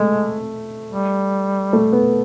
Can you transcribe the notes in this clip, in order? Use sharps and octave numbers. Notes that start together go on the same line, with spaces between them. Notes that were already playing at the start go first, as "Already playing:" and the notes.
Already playing: G#3 A3
G3
A3
B3